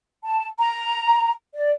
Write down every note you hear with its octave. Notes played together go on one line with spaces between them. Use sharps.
A5
A#5
D5